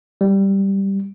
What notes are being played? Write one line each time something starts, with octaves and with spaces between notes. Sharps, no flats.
G3